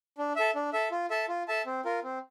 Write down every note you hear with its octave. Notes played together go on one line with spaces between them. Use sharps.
D4
A4 E5
D4
A4 E5
F4
A4 E5 A5
F4
A4 E5 A5
C4
F4 A#4
C4